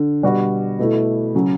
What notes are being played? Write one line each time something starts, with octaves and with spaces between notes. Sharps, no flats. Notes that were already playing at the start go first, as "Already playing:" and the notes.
Already playing: D3
B2 G3 D4 F#4
B2 A3 E4
C#3 F#3